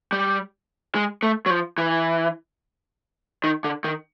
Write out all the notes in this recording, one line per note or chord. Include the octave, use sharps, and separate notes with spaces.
G3
G#3
A3
F#3
F3
E3
D#3
D3
D#3